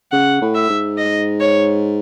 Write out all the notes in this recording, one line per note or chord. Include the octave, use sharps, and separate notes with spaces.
C#3 F#5
A2
E5
G#2
D#5
C#5